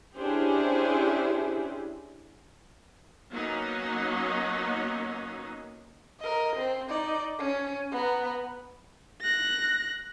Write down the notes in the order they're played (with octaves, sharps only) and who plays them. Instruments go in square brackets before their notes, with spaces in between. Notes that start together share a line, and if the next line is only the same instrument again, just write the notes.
[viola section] C#4 D4 E4 G4 G#4 C5
F#3 A#3 B3 C#4 D#4
[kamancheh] A#4 D#5
C4
D#4 D5
C#4
B3 A#5
[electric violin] F#6 A#6